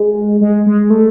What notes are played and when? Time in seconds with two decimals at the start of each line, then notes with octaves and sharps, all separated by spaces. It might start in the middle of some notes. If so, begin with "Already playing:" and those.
Already playing: G#3
0.41 G#3
0.66 G#3
0.90 A3